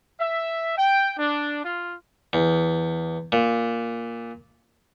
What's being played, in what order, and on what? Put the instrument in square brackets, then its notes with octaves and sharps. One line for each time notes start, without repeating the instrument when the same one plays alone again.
[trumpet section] E5
G5
D4
F4
[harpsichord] E2
A#2